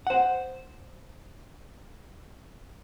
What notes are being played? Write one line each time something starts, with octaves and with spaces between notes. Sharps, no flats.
C5 F#5